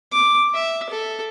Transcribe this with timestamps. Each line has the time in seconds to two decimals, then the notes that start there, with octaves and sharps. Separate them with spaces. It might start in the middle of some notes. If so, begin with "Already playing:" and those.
0.12 D6
0.54 E5
0.90 A4